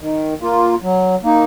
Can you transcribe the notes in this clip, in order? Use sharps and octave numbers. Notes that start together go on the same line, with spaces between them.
D#3
A#3 F4
F#3
A#3 D#4